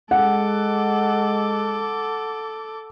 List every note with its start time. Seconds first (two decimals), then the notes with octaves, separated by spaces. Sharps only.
0.11 G#3 A4 F#5 D6